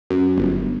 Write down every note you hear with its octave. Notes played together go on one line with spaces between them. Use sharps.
F#2
G1